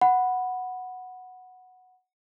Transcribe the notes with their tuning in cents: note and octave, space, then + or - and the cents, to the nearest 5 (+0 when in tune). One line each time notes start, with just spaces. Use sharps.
F#5 -5 B5 +0